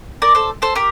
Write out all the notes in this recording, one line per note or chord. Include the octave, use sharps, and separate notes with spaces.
A#4 D5
A4 C5
A4 C5
G4 A#4